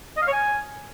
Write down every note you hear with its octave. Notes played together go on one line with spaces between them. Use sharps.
D#5
F5
C#5
G#5